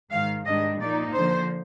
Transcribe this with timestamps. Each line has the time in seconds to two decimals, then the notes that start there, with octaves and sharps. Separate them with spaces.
0.10 G#2 D#3 G#3 F5
0.45 G#2 D#3 G3 D4 D#5
0.79 A#2 F3 A#3 D#4 D5
1.13 D3 F3 A#3 C5